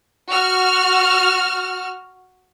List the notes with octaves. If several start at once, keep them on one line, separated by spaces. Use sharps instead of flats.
F#4 F6